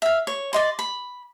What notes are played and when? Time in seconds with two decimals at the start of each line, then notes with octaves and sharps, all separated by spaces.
0.02 E5 F5
0.27 C#5
0.53 D5 D#5 C6
0.79 B5